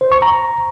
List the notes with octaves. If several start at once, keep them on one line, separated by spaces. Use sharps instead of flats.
C5
C#6
A#5